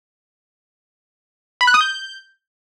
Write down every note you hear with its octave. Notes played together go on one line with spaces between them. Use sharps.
B5
F#6
D#6
G6